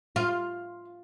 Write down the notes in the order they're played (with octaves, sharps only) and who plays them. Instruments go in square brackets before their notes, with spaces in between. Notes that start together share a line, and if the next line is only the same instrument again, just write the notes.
[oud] F4